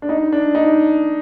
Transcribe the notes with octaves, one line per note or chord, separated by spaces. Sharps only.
D4
D#4
D4
D#4